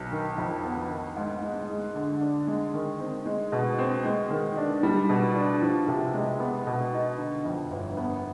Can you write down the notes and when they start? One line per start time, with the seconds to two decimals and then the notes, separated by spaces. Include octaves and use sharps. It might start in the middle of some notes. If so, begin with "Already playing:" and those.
Already playing: B1
0.11 D#3
0.38 F2
0.64 B3
0.90 D#3
1.16 G#2
1.43 G#3
1.69 G#3
1.95 D3
2.21 D4
2.47 G#3
2.74 D#3
3.00 C4
3.26 G#3
3.52 B2
3.78 C4
4.05 G#3
4.30 D#3
4.57 D4
4.83 G3
5.09 B2
5.35 D4
5.62 F3
5.88 C3
6.14 G#3
6.40 B3
6.67 B2
6.93 D#4
7.19 D3
7.45 F2
7.71 G1
7.97 B3